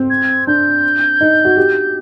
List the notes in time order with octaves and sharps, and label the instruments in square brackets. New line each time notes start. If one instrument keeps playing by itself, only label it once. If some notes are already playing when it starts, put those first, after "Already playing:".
Already playing: [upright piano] C4
[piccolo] G#6
[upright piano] D4 [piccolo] G6
[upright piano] D#4
F#4
G4